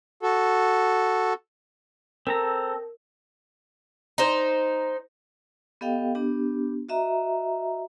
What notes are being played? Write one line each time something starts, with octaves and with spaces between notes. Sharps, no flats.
F#4 A4
C4 A4 A#4 A#5
D#4 C5
B3 G4 A4 D#5 F5 G5
B3 D4 G4
F#4 D#5 E5 A#5